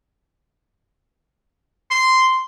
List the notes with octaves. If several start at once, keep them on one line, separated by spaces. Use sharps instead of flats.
C6